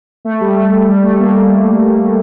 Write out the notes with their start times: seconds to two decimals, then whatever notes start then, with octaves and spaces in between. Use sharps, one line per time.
0.25 A3
0.41 G3
0.56 A3
0.89 G3
1.03 A3
1.20 A#3